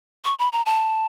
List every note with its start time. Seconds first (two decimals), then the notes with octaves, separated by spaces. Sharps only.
0.25 C#6
0.39 B5
0.52 A#5
0.66 A5